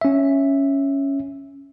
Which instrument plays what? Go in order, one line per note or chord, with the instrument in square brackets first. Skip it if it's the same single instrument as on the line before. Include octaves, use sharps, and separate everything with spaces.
[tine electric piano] C#4 E5